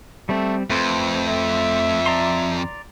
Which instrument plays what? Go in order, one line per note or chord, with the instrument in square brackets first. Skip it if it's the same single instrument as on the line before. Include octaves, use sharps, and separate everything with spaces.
[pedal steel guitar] G3 C4 [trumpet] A3
[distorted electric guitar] F2 [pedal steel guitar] A3 B4 C5 [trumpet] C4
[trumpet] E5
[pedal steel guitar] D5 A#5 C6